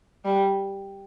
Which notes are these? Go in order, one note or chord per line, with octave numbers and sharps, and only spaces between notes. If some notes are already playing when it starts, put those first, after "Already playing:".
G3